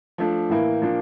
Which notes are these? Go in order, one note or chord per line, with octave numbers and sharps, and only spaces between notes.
F3 A3 D4
A2 E3 A#3 E4
A#2 F3 A#3 D4